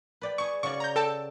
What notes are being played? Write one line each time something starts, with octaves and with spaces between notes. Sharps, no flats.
B4 D5 G5
G#4 A5 C#6
C#3 F#4 D5 C#6
A#5 G6
A4 G5 A5